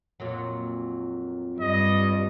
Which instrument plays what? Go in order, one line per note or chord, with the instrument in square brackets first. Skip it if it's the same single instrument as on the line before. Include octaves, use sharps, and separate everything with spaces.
[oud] F2 A#2 F#3
[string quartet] G2 [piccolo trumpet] D#5